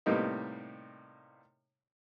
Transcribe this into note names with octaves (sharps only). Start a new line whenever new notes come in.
A2 C3 G3 A#3 B3 D#4